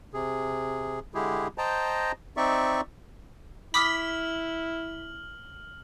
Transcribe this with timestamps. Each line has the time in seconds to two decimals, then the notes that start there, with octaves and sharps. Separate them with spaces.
0.14 C3 G#4
1.14 D3 G#3 E4 G4 G#4
1.58 C5 D#5 G5 A5 A#5
2.37 C4 D#4 D5 E5 C#6
3.74 E4 B5 D6 D#6 F6 B6 F#7